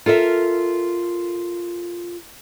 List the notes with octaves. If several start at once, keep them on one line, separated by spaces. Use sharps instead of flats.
F4 A4 A#4 E5